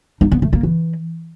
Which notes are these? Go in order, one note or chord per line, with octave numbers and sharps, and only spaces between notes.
D#4
B3
A3
A#3
E3